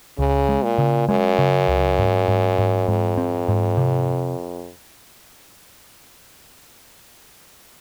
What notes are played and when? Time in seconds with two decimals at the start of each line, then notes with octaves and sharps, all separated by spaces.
0.18 C#2 C#3
0.49 G#3
0.64 A#2
0.78 C#3
1.08 F#2 G#3
1.38 C#3
1.68 C#2
1.99 G#2
2.28 G#2
2.58 G#2
2.88 F2 G#2
3.18 C4
3.48 G#2
3.77 C3